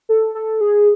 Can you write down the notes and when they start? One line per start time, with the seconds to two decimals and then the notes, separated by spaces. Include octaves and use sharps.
0.09 A4
0.35 A4
0.61 G#4